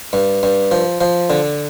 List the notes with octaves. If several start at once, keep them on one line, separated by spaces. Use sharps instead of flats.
G2
G2
F3
F3
D3